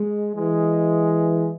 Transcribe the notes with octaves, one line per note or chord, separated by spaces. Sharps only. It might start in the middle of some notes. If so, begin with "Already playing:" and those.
Already playing: G#3
E3 G#3